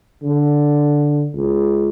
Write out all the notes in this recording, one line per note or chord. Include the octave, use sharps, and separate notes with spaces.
D3
C#2